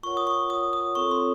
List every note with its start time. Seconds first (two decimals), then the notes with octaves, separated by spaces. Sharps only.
0.03 F4 A#4 C#5 F#5 C#6
0.17 D#6
0.27 C#6
0.50 D#6
0.73 D#6
0.95 C4 F4 A4 C#5 C#6
1.11 C6